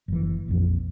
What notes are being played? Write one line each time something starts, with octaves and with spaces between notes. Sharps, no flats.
F#1 E3
A#1 F2